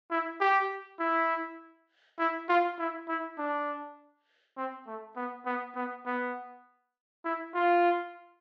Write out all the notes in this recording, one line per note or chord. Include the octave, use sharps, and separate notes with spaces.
E4
G4
E4
E4
F4
E4
E4
D4
C4
A3
B3
B3
B3
B3
E4
F4